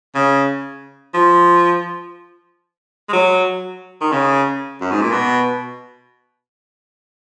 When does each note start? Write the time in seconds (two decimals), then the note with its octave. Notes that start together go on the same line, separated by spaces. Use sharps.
0.15 C#3
1.14 F3
3.09 G#3
3.13 F#3
4.01 D#3
4.12 C#3
4.81 F#2
4.91 G#2
5.01 A#2
5.12 B2